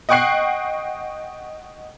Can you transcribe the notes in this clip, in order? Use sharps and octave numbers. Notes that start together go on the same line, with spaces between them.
D#5 F#5 G5 C#6 F#6 C7